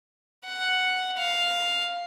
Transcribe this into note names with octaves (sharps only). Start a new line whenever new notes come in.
F#5
F5